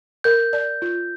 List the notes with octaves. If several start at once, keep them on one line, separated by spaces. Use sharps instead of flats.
A#4 G6
D5
F4